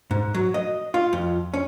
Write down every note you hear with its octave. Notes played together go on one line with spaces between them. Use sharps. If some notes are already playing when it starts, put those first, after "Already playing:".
G#2
F#3
D#5
F4
F2
C#4